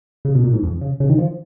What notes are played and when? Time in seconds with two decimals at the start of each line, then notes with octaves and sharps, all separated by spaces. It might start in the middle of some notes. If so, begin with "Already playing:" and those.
0.25 C#3
0.35 B2
0.44 A#2
0.54 G#2
0.63 F2
0.81 C#3
1.00 C#3
1.09 D#3
1.18 F3